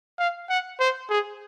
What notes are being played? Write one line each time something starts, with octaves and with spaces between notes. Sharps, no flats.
F5
F#5
C5
G#4